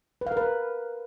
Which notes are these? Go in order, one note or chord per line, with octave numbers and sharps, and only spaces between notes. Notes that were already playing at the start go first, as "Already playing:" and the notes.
B4
F5
A#4
B4